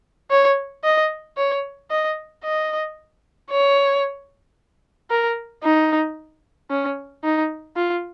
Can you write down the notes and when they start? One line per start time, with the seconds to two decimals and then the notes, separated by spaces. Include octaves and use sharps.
0.31 C#5
0.84 D#5
1.37 C#5
1.90 D#5
2.44 D#5
3.50 C#5
5.10 A#4
5.63 D#4
6.70 C#4
7.24 D#4
7.76 F4